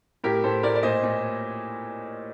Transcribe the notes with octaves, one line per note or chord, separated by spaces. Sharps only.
A2 G4 A#4
A2 A4 C5
A2 A#4 D5
D5
A#2 C5 D#5
A#2